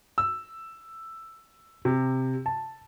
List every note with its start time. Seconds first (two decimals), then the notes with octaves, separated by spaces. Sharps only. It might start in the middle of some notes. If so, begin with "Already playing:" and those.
0.18 E6
1.85 C3
2.46 A5